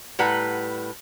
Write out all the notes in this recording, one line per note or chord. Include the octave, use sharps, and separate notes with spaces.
A2 G3 B4 F#5 A#5